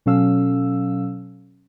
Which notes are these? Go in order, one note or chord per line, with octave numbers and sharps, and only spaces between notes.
B2 F#3 C#4 A4 F5 E6